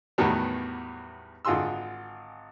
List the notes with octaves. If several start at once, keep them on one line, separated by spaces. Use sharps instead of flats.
E2 A2 D#3 F#3 G3 B3
G#1 D3 F4 G#4 C6 E6